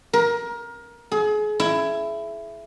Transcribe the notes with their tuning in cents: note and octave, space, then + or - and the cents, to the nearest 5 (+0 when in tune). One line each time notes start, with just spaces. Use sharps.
A#4 +20
G#4 +35
E4 +15